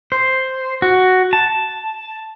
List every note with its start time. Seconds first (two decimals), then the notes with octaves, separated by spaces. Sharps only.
0.12 C5
0.82 F#4
1.33 A5